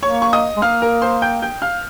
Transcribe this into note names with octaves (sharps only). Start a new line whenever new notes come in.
A#3 C#5 C#6
C#6
D#5 D#6
G#3
A#3 F5 F6
A#4 A#5
C5 C6
G5 G6
G5 G6
F5 F6